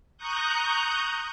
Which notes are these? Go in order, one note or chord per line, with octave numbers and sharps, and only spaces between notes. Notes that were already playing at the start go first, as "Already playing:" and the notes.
A#5 C#6 D#6 F#6 G6